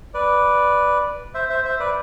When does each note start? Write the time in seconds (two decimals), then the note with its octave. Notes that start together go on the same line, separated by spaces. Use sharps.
0.14 B4 D5
1.34 C5 E5
1.50 C5 E5
1.65 C5 E5
1.80 B4 D5